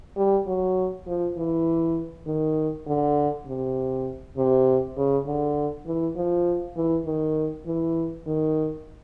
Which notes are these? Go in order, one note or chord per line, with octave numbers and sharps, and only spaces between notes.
G3
F#3
F3
E3
D#3
D3
C3
C3
C#3
D3
E3
F3
E3
D#3
E3
D#3